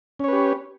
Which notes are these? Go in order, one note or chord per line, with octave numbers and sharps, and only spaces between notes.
C#4 G4 B4 C#5